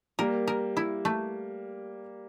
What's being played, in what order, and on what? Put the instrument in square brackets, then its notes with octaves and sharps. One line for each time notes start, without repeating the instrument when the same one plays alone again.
[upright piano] G3 A#3 [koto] A#4
[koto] A#4
E4
A3